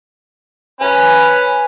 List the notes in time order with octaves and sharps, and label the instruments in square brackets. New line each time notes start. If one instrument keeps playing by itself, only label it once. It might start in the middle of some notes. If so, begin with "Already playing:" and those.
[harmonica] C#4 [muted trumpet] B4 [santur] G#5 A#5